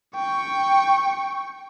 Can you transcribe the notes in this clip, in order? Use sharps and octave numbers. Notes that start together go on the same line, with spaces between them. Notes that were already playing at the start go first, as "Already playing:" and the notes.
G5 C#6